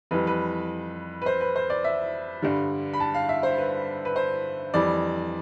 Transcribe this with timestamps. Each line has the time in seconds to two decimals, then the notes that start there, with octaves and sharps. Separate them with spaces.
0.11 F2 E3 G3 B4
0.27 B4
1.22 B4
1.26 C5
1.41 B4
1.56 C5
1.70 D5
1.84 E5
2.42 G2 D3 G3
2.93 B5
3.00 A5
3.14 F5
3.29 E5
3.43 C5
3.58 B4
4.05 B4
4.16 C5
4.74 F2 E3 G3 D5